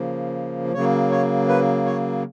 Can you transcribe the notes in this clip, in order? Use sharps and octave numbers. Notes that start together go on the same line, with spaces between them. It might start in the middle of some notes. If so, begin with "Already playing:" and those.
Already playing: C#3 F3 A#3
C#3 F#3 A#3 C#5
C#5
B4
C#5